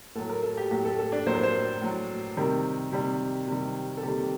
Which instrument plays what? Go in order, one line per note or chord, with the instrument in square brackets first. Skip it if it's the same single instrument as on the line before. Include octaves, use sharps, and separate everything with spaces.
[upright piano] A2 F#3 A4
A#4
A4
G4
A2 F#3 G4
A4
A4
D4
A2 F#3 C5
A#4
C5
A2 F#3
C3 D#3 G3 A#4
C3 D#3 G3
C3 D#3 G3
A4
C3 D#3 G3 G4